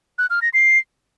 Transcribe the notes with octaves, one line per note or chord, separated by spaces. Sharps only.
F#6
F6
A#6
C7